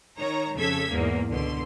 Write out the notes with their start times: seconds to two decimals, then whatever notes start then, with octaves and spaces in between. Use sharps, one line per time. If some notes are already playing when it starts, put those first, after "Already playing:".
0.18 D#3 C#5 A#5
0.57 F2 C#3 A4 G#6 B6
0.89 E2 G#2 A#3
1.31 C#2 B2 D3 C6